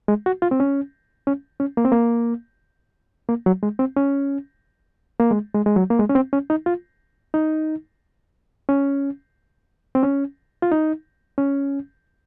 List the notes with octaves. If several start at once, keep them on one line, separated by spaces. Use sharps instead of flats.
G#3
F#4
F4
C4
C#4
C#4
C#4
A#3
C4
A#3
A#3
F#3
G#3
C4
C#4
A#3
G#3
G#3
G#3
F#3
A#3
G#3
C#4
C4
C#4
D#4
F4
D#4
C#4
C4
C#4
F4
D#4
C#4